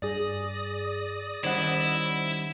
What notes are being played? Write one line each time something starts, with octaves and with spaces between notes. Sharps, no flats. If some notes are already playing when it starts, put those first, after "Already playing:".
G2 G#4 D5 D#6 A#6
D#3 G3 C#4 E4 C5 D#5 F#5